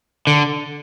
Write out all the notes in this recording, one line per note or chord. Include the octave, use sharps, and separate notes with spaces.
D3